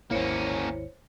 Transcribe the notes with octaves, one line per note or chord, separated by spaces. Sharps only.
G#1 D#2 A#3 C#4 E4 C5 C#5 C#7